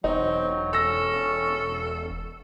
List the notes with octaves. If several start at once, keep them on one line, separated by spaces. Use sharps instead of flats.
E1 F#3 C4 D#4
E1 C#4 A4 E6 A#6